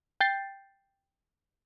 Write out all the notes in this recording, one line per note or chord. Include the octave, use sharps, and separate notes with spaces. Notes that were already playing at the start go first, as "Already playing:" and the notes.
G5 G6 A6 C7